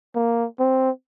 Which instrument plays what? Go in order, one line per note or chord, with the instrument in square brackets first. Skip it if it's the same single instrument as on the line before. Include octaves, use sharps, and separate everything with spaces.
[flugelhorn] A#3
C4